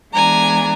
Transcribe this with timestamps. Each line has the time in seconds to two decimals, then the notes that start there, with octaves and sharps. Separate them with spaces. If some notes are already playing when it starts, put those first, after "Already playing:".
0.13 E3 G#3 B3 D4 G#5 A#5